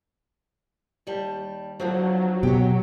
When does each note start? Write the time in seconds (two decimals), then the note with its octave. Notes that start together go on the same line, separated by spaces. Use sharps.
1.07 D#2 G3 A5
1.80 E2 D3 F3 F#3
2.43 B2 G4 C#5